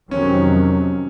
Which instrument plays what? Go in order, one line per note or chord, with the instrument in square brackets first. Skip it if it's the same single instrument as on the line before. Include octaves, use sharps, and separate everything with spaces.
[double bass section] F2 C3 D#3 F#3 [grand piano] C#4